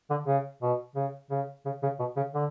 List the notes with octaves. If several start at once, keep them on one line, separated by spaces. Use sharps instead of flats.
D3
C#3
B2
C#3
C#3
C#3
C#3
B2
C#3
D3